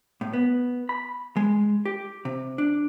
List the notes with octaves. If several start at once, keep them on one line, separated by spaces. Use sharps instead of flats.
A2
B3
B5
G#3
G4
C3
D4